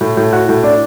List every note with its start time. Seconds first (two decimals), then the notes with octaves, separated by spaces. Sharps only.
0.01 A2
0.17 A2
0.33 F#4
0.49 A2
0.63 D4